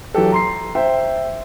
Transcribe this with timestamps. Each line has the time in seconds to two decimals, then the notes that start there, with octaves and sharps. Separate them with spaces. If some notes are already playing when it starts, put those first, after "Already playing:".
0.14 E3 F#3 G4 A4
0.32 A#5 C6 C7
0.75 C5 E5 G5